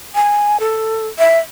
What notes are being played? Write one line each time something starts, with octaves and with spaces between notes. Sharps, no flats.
G#5
A4
E5